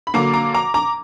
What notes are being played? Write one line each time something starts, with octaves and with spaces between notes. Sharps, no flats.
B5
D3 F#3 A#3 A#5 D6
A#5 D6
A#5 D6
A#5 D6